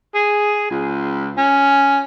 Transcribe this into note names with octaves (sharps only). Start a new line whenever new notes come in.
G#4
C#2
C#4